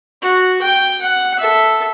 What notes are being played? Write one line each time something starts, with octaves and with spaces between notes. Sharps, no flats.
F#4
G5
F#5
A4 E5